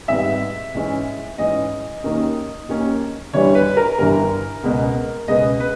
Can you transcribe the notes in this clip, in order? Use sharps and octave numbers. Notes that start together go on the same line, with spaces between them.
G#1 G#2 G3 B3 E5
G#2 E3 G#3 C#4
G#2 E3 G#3 C#4 D#5
D#2 D#3 A#3 C#4
D#2 D#3 A#3 C#4
G1 G2 E3 G3 C#5
B4
A#4
G1 G2 E3 G3 A#4
C#2 B2 G#3 B3
C#2 B2 G#3 B3 D#5
B4